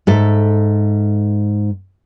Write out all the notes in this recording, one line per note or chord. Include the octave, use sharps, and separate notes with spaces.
G#2 A4 E5